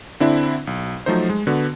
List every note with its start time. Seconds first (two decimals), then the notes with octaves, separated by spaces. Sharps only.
0.20 D3 C4 D4 E4
0.67 B1
1.06 F3 F#3 A3 D#4 C5
1.29 G#3
1.47 D3 B3 F#4